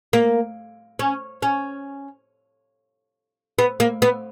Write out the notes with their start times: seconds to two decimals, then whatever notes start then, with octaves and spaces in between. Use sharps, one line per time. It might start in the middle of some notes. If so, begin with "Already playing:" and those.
0.13 A#3
0.99 C#4
1.42 C#4
3.59 B3
3.80 A#3
4.02 B3